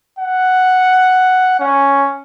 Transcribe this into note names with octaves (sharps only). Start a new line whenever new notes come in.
F#5
C#4